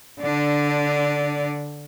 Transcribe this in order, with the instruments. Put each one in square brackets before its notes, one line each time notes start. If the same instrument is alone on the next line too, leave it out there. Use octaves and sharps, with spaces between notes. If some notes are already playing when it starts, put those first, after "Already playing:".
[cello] D3 D4